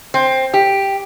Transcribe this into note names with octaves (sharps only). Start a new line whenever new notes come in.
C4
G4